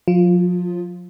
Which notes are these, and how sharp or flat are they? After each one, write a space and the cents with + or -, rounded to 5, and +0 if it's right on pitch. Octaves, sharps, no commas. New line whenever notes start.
F3 +40 F4 +0